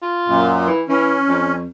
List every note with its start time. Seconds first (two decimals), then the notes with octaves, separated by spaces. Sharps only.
0.02 F4
0.27 F#2 A#2
0.67 E3
0.89 E3 C#4
1.28 F2